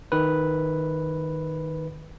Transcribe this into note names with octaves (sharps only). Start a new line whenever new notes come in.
D#3 B4